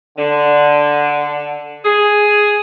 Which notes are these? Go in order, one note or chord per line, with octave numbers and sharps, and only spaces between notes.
D3
G#4